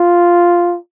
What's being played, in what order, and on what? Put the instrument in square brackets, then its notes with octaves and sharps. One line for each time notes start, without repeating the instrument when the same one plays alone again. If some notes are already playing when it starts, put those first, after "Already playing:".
Already playing: [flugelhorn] F4